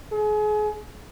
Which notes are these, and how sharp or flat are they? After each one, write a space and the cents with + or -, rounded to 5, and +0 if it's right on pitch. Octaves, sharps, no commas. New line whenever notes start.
G#4 +30